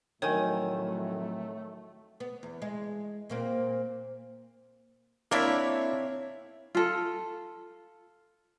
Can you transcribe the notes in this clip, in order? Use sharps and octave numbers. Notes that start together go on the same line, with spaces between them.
F2 A2 D#3 F#3 A3 C#5 G#5
B3
E2
G#3
A#2 A#3 C4
A#3 C4 D4 E4 C#5 E5
F4 A4